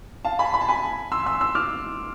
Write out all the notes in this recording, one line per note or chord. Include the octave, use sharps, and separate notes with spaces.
F5 A5
G#5 B5
B5
A5
G#5 B5
C6 E6
C6 E6
C6 E6
D6 F6